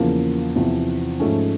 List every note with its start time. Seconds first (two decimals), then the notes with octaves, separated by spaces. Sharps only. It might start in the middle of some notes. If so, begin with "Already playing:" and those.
Already playing: E2 C#3 F3 A#3
0.56 E2 C3 F3
1.20 G#2 F3 A3 C#4